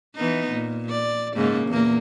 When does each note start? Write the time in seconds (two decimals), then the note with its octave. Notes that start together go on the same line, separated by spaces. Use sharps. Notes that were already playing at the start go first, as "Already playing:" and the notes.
0.16 E3 B3 D#4
0.50 A#2
0.89 D5
1.36 G#2 C#3 A#3
1.68 E2 A#2 A#3